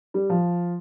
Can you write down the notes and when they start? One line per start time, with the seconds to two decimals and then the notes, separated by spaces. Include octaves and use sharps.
0.14 G3
0.30 F3